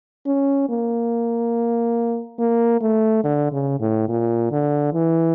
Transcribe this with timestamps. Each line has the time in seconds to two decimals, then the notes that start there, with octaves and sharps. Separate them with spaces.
0.27 C#4
0.69 A#3
2.39 A#3
2.81 A3
3.24 D3
3.52 C#3
3.80 A2
4.09 A#2
4.52 D3
4.94 E3